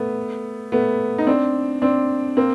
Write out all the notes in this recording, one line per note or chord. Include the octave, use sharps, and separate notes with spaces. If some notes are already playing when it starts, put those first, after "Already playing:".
Already playing: A3 B3
A3 B3
D#4
C4 D4
C4 D4
A#3 C4